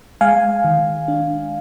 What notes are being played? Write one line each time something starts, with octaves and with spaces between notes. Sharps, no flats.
G#3 F5 G#5
D#3
D4